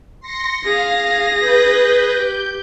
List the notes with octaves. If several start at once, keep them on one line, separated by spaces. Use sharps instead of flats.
C6 A#6 C#7
G#4 F5 A#6
B4 G6
G4 G6